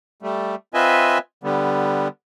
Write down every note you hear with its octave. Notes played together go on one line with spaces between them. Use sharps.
G3 A3
C4 F4 B4 D#5 E5 G#5
D3 G3 B3